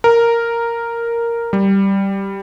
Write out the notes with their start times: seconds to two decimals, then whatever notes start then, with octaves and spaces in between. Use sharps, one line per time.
0.04 A#4
1.53 G3